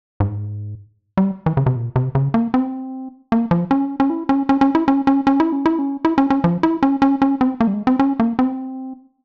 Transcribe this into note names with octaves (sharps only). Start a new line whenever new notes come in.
G#2
G3
E3
C#3
C3
A#2
C3
C#3
A#3
C4
A#3
F3
C#4
C#4
E4
C#4
C#4
C#4
E4
C#4
C#4
C#4
E4
C#4
E4
C#4
E4
C#4
C#4
F3
E4
C#4
C#4
C#4
C4
A#3
G3
G#3
C4
C#4
A#3
C4